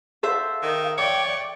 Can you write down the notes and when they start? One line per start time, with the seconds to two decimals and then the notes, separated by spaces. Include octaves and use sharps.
0.23 A4 C5 E5 F5
0.62 D#3
0.98 C#5 D5 G5 D6